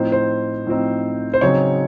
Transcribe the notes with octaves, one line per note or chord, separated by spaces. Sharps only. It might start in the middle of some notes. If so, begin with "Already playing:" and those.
Already playing: A2 F3 C4 D#4 C5
C5
A2 F3 C4 D#4
C5
C#3 F#3 C4 D#4 C#5